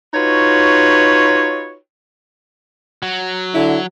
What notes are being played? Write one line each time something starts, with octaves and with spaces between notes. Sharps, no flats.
D#4 F4 F#4 B4 C#5
F#3
D3 E4